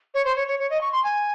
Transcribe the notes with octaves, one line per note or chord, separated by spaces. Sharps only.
C#5
C5
C#5
C#5
C#5
D#5
C#6
C6
G#5